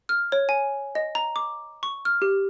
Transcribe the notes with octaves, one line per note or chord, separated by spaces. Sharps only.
F6
C#5
G#5
D#5
A#5
D6
C#6
F6
G4